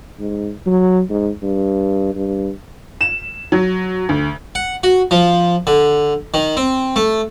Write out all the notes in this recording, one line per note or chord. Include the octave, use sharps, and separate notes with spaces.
G#2
F#3
G#2
G2
G2
E7
F#3
D2
F#5
F#4
F3
D3
D#3
C4
A3